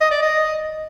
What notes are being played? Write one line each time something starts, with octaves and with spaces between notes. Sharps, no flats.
D#5
D5
D#5